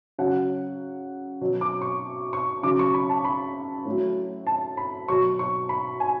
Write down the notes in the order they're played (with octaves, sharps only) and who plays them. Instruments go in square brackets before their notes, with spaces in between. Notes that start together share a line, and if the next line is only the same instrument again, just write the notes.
[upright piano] C#3 F#3 F#5
B2 F#3
D6
C#6
C#6
C#3 F#3 D6
C#6
B5
A5
B5
A2 F#3
A5
B5
B2 F#3 C#6
C#6
B5
G#5